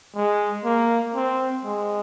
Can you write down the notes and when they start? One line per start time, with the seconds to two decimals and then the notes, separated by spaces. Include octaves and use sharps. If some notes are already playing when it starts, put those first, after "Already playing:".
0.15 G#3
0.65 A#3
1.15 C4
1.64 G#3